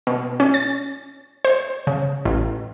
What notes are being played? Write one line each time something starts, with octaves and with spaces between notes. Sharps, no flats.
B2
C#4
A6
C5
C#3
A1